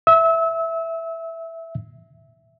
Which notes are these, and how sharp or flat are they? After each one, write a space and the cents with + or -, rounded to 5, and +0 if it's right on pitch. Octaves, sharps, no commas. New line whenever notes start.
E5 +0 E6 -30